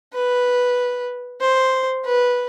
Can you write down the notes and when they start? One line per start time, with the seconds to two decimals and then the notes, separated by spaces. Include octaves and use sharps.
0.14 B4
1.41 C5
2.05 B4